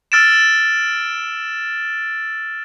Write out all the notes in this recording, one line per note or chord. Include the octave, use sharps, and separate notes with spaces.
E6 F6 A6 D7 E7